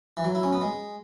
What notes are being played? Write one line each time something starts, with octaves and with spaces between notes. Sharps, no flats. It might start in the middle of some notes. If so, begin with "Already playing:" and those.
E3
F#3
E4
C#4
B3
G#3